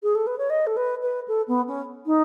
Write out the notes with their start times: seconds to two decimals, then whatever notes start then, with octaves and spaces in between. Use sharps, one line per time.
0.03 G#4
0.15 A4
0.27 B4
0.38 C#5
0.50 D#5
0.67 A4
0.77 B4
1.02 B4
1.28 A4
1.48 B3
1.68 C#4
2.06 D#4